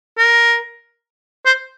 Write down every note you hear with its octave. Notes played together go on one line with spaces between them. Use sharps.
A#4
C5